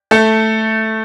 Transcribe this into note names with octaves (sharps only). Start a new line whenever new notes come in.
A3 A4